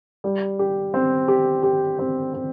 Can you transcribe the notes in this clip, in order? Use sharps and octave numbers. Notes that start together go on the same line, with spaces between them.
G3
G4
C4
G4
G4
C4
C4